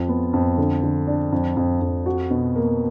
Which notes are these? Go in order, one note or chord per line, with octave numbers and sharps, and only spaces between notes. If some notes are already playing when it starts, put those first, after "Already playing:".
Already playing: F2 F4
B3
F2
D3
D3
D4
F2
F2
F2
F#4
B2
A#3